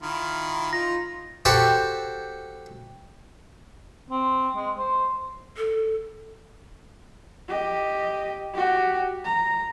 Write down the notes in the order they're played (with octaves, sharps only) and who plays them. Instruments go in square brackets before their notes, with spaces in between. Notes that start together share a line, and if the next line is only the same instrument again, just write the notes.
[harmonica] D#3 E4 F4
[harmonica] D#4 [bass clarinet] F4 [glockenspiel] A#6
[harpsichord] F#4 G4 A4 C5 F#5
[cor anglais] C4
G#3
C5
[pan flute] A4
[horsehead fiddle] G4 D#5
F#4 G4
A#5